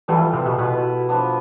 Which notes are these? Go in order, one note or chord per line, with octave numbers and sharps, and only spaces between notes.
E3 G3 B3 F4 A4
C3
B2
B2 B3 E4 B4
F3 B3 D4